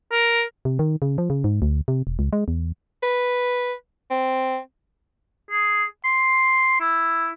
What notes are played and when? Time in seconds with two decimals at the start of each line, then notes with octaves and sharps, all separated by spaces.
0.12 A#4
0.65 C3
0.79 D#3
1.02 C#3
1.18 F3
1.30 C#3
1.44 G#2
1.62 D2
1.88 C3
2.07 E1
2.19 C#2
2.33 G#3
2.48 E2
3.03 B4
4.11 C4
5.50 G#4
6.04 C6
6.80 E4